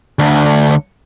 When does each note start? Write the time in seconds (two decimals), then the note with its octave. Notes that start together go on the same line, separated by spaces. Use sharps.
0.19 D2 D3